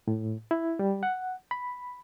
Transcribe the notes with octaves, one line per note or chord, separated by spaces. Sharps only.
A2
E4
G3
F#5
B5